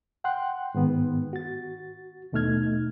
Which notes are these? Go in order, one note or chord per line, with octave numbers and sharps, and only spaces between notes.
F#5 G5 C6 F#6
G#2 D#3 B3
F#4 A6
D#2 B2 A3 D#4 F6 G#6